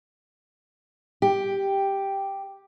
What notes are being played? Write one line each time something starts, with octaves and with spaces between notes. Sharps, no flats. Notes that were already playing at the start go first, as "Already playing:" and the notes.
G4